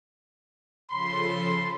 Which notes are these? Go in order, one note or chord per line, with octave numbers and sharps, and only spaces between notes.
C#3 F3 A4 B5 C6